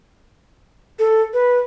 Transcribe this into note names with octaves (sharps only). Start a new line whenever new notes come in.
A4
B4